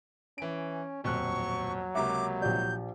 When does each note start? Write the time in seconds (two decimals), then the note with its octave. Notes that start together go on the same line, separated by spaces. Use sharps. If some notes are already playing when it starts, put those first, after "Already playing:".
0.38 E3 C#4 G#5 D7
1.04 D#1 B1 F2 F#3 C#6 F#6
1.95 C#2 C3 A#3 E5 A#5 D6
2.42 A#1 G4 D5 G6